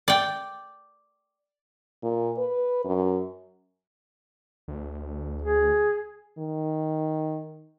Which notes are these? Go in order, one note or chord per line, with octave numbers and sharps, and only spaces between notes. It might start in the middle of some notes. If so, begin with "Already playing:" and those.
D5 G5
A#2
B4
F#2
D2
G#4
D#3